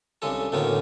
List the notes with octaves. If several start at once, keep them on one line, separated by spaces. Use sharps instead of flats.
C2 C#3 G#3 D4 A4
D2 A2 D3 A#3 B3 C#4